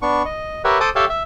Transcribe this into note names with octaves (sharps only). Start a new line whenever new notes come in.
B3 D4 C#6
D#5
G4 A#4 B4 C#5 E5 F#5
A4 C5 A5 D6 D#6
G4 A4 C#5 E5 F5 A5
E5